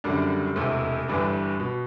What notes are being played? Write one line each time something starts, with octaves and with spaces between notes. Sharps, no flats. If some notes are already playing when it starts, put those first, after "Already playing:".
F#1 F#2 D3 G3 D4
E1 E2 C3 E3 A3
G1 G2 E3 G3 D4
B2